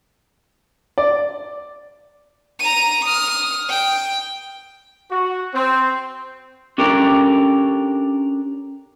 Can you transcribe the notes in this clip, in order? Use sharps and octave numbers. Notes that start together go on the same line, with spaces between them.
D5
A#5 D#7
D#6 F6
G5
F#4
C4
C#4 D4 G4 A4 A#4